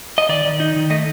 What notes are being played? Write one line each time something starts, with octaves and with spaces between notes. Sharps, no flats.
D#5
D#3 D5
D#3
D#4
D#3
A3 D#5